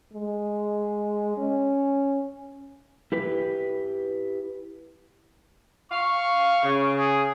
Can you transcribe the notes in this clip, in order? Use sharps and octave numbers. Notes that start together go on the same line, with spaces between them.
G#3
C#4
E4 G4 B4
F5 C#6
C#3
G#4